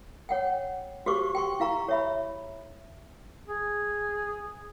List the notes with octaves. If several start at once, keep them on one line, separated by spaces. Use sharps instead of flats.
C#5 F#5 G5
F#4 G4 C5 C#6 D6
G5 C6 C#6
E4 F5 A#5 C#6
C#5 E5 B5
G#4